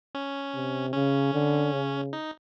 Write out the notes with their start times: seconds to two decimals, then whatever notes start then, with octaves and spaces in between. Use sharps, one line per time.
0.15 C#4
0.55 C3
0.94 C#3 C#4
1.34 D3
1.73 C#3
2.13 D#4